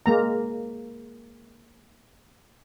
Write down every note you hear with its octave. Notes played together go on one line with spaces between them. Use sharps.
G#3 A#3 A#5